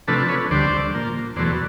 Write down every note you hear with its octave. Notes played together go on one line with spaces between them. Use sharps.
C3 F3 A3 D4 A4 B4
B4 C#5
D2 D3 G3 C5 D5
A#2 F3 A#3
E2 B2 F#3 A3 C5 D5